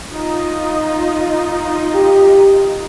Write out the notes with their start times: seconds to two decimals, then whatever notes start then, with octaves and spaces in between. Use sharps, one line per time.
0.11 D#4 F4 D#5
1.95 G4